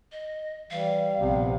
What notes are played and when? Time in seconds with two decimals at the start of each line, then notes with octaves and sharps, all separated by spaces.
0.12 D#5
0.71 E3 G3 F5
1.20 A#1 C3 B3